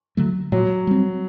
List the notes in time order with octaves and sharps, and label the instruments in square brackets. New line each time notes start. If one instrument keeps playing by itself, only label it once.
[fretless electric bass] D3 F#3 A3
[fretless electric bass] A#2 [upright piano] F#3
[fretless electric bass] G3 C4